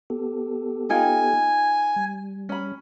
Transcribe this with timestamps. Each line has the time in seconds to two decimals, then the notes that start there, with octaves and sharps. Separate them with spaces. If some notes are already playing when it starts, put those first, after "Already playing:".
0.10 B3 G4 A4
0.90 D#4 F4 G5 G#5
1.96 G3
2.49 C#4 B5